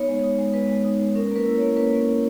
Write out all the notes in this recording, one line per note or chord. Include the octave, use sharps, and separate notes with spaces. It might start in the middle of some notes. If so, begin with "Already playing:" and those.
Already playing: B3 D#4 C#5
G#3
D#4
G#3
B3 B4
G#3
D#4
G#3
C#4 A#4
A#3 B4
E4
A#3 C#5
C#4 B4
A#3
E4